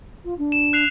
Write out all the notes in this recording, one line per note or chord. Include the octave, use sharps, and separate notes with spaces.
F4
D4
E7
F#6 C7 F7